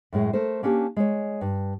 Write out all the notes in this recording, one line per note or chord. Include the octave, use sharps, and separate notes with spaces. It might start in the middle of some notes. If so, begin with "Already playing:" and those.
F#2 A2 G#3
A3 A#4 C5
A#3 C#4 D4 G4
G#3 C#5
G2